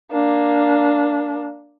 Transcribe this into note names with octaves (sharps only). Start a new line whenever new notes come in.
A#3 D4